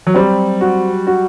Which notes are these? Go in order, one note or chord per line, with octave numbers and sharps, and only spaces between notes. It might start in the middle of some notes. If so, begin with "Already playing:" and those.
F#3
G3 C4
F#4
F#4